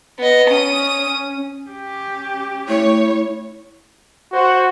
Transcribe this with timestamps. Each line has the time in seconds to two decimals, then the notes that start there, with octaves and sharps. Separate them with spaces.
0.18 B3 D#5
0.50 C#4 D#6 D#7
1.69 C#4 G4
2.68 A3 E4 C#5
4.33 F#4 C5 F#5